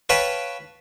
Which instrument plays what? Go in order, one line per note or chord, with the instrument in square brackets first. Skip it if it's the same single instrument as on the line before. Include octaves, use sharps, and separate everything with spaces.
[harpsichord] B4 C#5 F5 G5 A5 B5